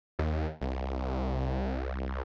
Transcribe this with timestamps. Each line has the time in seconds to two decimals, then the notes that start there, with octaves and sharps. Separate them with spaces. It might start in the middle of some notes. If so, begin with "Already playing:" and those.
0.19 D#2
0.61 C2